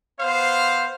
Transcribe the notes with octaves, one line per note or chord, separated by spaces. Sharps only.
B3 C5 F5